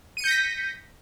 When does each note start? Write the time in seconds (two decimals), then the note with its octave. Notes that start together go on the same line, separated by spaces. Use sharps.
0.17 D#7
0.20 C#7
0.24 G6
0.27 A#6
0.31 B6